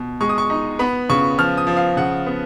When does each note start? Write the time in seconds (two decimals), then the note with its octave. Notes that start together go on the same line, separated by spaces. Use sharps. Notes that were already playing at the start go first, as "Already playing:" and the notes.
Already playing: B2
0.21 G#3 C#6
0.29 D#6
0.38 C#6
0.50 D#4
0.79 B3 B5
1.09 C#3 C#6
1.38 F3 F6
1.57 D#6
1.67 F3
1.77 F5
1.97 C#3 F#5
2.26 B3